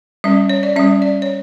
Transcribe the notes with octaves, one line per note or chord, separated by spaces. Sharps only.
G3 C#4 E5
C#5
D5
G3 C#4 E5
D5
C#5